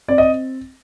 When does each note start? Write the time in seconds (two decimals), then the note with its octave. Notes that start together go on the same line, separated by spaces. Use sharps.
0.08 C4 D5
0.18 D#5